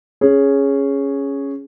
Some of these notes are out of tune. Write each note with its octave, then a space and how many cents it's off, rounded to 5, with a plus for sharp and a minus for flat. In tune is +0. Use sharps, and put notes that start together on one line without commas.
C#4 +0 G#4 +0